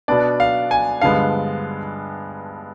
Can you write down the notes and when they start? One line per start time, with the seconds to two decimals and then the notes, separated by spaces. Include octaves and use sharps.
0.08 B2 B3 D4 D5
0.40 F5
0.71 G#5
1.01 G2 D3 F3 G#3 B3 F5